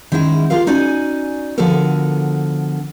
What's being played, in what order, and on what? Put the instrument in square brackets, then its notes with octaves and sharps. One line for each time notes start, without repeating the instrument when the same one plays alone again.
[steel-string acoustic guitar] D#3 G#3 C#4 E4 F#4
F4 G4 G#4 A#4 F5
C#4 D#4 F#4 D5 G#5
D3 F3 B3 F#4 A4 A#4